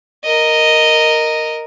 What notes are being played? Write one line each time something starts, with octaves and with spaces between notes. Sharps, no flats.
A#4 D#5